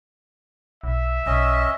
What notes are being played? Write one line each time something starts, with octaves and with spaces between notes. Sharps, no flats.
B1 E5
B1 C#4 D#5